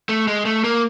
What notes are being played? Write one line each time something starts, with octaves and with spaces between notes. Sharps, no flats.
A3
G#3
A3
A#3